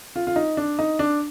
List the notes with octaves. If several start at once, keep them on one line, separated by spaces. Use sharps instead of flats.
F4
F4
D#4
D4
D#4
D4